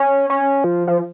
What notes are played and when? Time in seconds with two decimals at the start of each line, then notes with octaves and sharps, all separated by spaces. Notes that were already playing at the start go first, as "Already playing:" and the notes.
Already playing: C#4
0.30 C#4
0.64 F3
0.87 F3